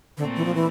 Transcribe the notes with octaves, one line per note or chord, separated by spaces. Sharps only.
A#2 D3 A3 C4
E3
F3
E3